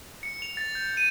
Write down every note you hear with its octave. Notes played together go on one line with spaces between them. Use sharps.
C#7
F7
A6
G6
D#7